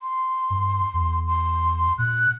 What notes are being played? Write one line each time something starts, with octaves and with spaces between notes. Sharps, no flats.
C6
G2
E2
C6
A#2 F#6